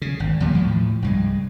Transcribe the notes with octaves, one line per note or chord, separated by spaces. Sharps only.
C#3
G#1
D#2 A#2 F3 G3
A2 F3
C2 G2 G#3